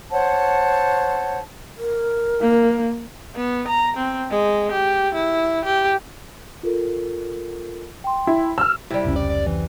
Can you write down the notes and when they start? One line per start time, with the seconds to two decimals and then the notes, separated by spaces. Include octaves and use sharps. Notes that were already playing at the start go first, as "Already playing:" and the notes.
0.11 C5 C#5 F#5 A5
1.78 A#4
2.40 A#3
3.36 B3
3.68 A#5
3.97 C4
4.31 G#3
4.72 G4
5.14 E4
5.65 G4
6.63 F4 A4 A#4
8.04 G5 C6
8.27 E4
8.58 E6 F6
8.90 C3 G3 E4
9.05 F1 C#2 C#4
9.16 D5
9.30 D5
9.47 E3